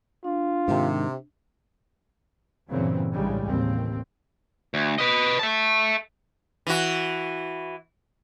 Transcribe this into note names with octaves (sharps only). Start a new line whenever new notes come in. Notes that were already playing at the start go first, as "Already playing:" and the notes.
D4 F4
G#2 C3 D#3
G2 A#2 C#3 E3 F#3 C4
A#1 A2 C#3 G3 G#3
A1 D#2 C4
D2
B4 D#5
E5 A5
E3 F#4